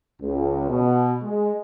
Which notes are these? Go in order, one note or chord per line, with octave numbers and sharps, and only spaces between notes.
C#2
B2
G#3